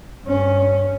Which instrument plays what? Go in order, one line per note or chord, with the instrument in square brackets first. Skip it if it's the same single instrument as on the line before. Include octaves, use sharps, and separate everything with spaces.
[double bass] G2 C#4